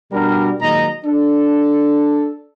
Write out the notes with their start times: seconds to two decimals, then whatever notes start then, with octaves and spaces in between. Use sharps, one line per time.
0.12 B2 G3 D4 F#4 A#4
0.60 A#2 D#3 F#3 G#3 D#5 A#5
1.05 D4 A4